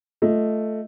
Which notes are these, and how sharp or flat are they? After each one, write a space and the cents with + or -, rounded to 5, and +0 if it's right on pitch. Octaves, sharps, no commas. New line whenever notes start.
A3 +0 F4 -10 D#5 +0